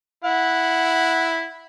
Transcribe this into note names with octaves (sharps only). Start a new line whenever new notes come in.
E4 F#5